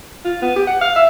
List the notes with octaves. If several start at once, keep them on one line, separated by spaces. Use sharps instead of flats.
F4
B3
G4
F#5
F5
E5